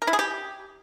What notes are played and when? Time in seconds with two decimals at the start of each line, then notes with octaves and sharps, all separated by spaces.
0.02 A#4
0.07 E4
0.13 G#4
0.19 G4